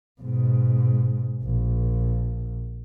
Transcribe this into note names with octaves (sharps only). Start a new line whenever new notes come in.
G#2 B2
A#1